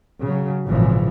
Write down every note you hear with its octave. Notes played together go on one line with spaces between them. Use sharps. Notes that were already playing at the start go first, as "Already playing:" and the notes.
C#3 F#3
G#1 A#2 C#3 E3 F3